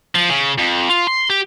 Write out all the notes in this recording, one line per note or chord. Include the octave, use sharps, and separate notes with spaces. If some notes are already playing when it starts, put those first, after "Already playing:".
F3
C#3
F2
F4
C6
G4